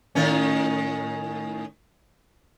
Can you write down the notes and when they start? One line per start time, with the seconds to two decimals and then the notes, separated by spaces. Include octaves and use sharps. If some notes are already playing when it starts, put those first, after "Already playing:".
0.15 A2 D#3 C#4